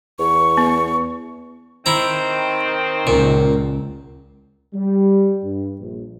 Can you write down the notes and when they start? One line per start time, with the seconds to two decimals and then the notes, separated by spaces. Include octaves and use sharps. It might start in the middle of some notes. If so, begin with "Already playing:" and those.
0.19 E2 C#6
0.57 B3
1.86 D#3 C4 E4 A#5
3.07 C#2 A#2
4.74 G3
5.43 G2
5.80 A#1